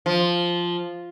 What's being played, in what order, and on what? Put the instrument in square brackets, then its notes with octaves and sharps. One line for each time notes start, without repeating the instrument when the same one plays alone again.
[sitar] F3